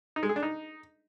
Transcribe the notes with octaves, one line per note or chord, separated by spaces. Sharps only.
D#4
G#3
G#4
D4
D#4